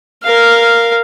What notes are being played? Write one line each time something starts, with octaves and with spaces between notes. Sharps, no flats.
A#4 F5